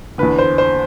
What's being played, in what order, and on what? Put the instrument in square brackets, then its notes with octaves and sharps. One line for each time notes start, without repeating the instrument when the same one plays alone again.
[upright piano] E2 D3 B4
C5
C5